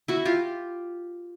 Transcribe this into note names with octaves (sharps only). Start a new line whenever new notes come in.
E4 F#4
F4 G4